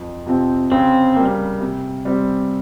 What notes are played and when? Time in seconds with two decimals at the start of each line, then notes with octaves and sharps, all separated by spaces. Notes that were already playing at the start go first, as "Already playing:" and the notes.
Already playing: F2
0.26 C3 F3 C4
0.72 C#3 C4
1.16 G3 A#3
1.61 C3
2.05 G3 C4